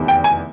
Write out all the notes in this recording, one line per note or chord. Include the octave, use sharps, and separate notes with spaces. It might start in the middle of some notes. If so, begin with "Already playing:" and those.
Already playing: F1 E2 C3 D#3
G5
G#5